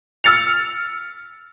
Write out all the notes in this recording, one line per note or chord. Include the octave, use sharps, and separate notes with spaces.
E6 F6 A6 C#7 F7